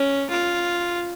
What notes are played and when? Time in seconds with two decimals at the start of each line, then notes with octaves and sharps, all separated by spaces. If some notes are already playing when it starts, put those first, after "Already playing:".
Already playing: C#4
0.30 F4